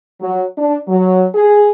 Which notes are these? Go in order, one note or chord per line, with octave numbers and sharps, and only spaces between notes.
F#3
D4
F#3
G#4